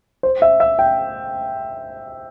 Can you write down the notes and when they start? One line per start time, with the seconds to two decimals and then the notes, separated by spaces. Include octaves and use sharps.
0.23 C5
0.42 E5
0.60 E5
0.79 G5